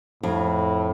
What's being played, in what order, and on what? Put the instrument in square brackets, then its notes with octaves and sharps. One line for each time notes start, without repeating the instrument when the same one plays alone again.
[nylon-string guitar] F2 [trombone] A2